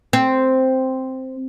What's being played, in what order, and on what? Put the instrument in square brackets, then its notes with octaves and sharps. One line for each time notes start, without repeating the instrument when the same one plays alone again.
[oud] C4